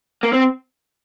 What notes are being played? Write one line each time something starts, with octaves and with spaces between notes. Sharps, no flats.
A#3
C4